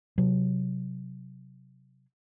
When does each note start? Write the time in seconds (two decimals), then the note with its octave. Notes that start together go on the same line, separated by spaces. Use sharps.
0.18 C3 F#3